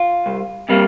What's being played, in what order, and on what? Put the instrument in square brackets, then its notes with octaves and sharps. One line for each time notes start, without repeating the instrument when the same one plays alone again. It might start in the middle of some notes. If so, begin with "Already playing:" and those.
Already playing: [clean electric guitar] F4
C2
C3 G3 A#3